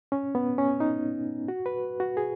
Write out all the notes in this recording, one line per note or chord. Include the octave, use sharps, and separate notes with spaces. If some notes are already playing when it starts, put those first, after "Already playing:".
C#4
B3
C#4
D#4
F#4
B4
F#4
G#4